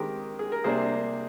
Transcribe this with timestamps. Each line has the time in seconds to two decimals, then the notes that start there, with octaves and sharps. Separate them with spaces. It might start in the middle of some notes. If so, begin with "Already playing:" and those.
Already playing: D#3 G#3 C4 G4 A#4
0.39 G#4
0.52 A#4
0.64 C3 G3 A#3 D4 G#4 C5